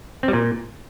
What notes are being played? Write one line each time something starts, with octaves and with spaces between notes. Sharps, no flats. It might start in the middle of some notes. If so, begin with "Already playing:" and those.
C4
G3
A#2